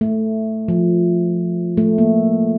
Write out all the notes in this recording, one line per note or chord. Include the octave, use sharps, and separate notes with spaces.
A3
F3
A3
A#3